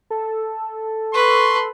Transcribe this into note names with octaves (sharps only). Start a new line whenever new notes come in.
A4
B4 C6 C#6